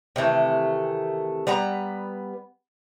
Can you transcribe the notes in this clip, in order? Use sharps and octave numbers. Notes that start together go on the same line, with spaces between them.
C3 D#3 E3 A3
G3 B3 B4 A#5